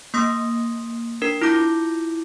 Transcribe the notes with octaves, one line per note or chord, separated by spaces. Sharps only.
A#3 C6 D#6 A#6
D4 A#4 C7
E4 F4 D6 G6 A#6